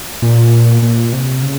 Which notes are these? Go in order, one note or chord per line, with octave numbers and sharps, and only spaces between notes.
A#2
A#2
C3
C#3